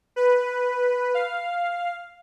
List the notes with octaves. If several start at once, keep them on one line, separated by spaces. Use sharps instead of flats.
B4
F5